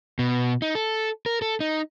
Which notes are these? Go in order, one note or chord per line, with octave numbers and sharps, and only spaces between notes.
B2
D#4
A4
A#4
A4
D#4